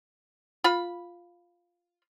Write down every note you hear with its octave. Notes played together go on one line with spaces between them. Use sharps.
F4 B5